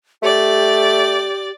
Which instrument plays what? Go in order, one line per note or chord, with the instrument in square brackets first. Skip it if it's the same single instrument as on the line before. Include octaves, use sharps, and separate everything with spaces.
[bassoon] A3 [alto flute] G4 [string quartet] D5